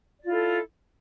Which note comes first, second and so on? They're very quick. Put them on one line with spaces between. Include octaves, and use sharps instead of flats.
D5 F4 E4 A4